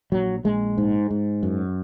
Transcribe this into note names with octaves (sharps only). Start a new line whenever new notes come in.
A#1 F#3
A#1 G#3
G#2
G#2
F#2